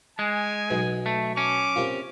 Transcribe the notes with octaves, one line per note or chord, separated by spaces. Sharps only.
G#3 G#5
B1 B2
A3
C#4 D6
C3 A#3 F4